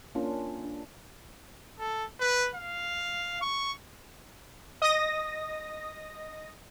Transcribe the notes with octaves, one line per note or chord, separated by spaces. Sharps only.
A#3 C#4 D4 F4
D4
A4
B4
F5
C#6
D#5 D#6 A#6